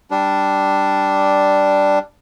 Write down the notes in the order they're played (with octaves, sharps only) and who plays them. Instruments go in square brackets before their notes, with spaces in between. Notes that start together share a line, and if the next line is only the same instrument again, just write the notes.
[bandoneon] G3 D4